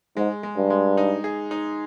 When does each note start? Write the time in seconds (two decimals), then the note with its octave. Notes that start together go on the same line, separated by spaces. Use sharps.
0.16 G#2 G#3
0.43 G#3
0.57 G2
0.70 G#3
0.97 D#4
1.24 G#4
1.51 D#4